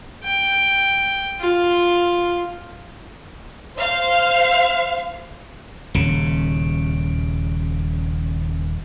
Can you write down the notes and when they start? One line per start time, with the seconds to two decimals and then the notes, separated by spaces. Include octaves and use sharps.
0.24 G5
1.40 F4
3.78 C5 F5
5.94 D#1 C#3